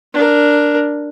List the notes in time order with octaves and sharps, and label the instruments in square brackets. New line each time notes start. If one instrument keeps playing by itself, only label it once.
[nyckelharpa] D4 A#4